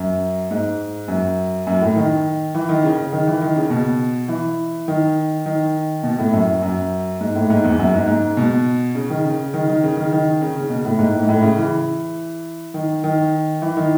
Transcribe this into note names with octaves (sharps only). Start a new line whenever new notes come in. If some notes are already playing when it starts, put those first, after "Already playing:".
Already playing: F#2
G#2
F#2
F#2
A2
D#3
E3
D#3
C#3
C#3
D#3
E3
D#3
C#3
B2
E3
D#3
D#3
B2
A2
F#2
F#2
G#2
A2
G#2
E2
F#2
G#2
G#2
B2
C#3
D#3
C#3
D#3
D#3
C#3
D#3
D#3
C#3
C#3
B2
A2
G#2
A2
G#2
A2
C#3
E3
D#3
D#3
E3
D#3